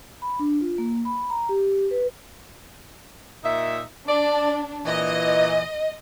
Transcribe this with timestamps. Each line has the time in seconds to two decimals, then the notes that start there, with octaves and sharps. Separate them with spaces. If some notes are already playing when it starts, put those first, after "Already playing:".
0.22 B5
0.39 D4
0.61 F4
0.78 A#3
1.05 B5
1.30 A#5
1.49 G4
1.91 B4
3.44 A#2 D#4 E5
4.08 D4 D5
4.86 A#2 E3 D#5